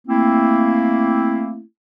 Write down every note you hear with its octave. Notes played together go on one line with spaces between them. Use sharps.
A3 A#3 C4 E4